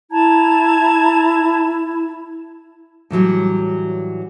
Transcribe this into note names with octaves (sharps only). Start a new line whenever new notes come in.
E4 A5 A#5 G#6
A2 E3 F#3 G3